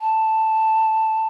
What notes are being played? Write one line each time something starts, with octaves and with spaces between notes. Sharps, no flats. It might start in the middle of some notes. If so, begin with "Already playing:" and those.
A5